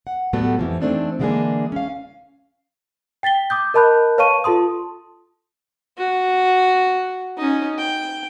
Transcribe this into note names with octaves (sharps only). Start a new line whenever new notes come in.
F#5
A2 F#3 G3 A3 B3
F2 E3 F3
E3 A3 C4 D4 D#4
D3 E3 G#3 A#3 D4 G#4
C#4 F5
G5 A6 B6 G7
D6 D#6 G6
A#4 D#5 A5 B5 F#6 G6
B4 C#5 F5 A5 C#6 D#7
F4 A4 A5 C6 D#6
F#4
C#4 D#4
G5